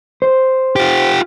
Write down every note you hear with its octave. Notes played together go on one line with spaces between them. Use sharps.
C5
F4 G4